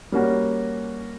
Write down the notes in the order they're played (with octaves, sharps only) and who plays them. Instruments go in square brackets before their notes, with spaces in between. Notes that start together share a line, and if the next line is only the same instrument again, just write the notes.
[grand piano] G3 A#3 C#4 F#4